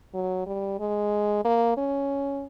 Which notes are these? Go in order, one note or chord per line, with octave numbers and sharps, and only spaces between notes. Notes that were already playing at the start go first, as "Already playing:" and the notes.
F#3
G3
G#3
A#3
C#4